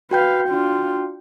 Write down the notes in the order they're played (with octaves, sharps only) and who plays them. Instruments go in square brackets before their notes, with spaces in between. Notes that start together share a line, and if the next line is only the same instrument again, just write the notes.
[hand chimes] F#4 G5 G6 [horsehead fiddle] B4 F5
[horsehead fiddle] D4 F4